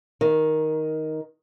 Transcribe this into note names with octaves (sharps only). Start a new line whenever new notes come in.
D#3